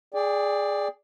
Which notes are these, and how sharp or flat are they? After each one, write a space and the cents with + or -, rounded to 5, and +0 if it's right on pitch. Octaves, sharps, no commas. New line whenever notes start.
G#4 +0 D5 +0 G5 +30